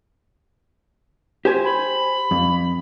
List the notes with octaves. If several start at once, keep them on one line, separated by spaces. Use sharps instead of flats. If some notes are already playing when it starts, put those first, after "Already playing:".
G4 C5 G#5
B5
F2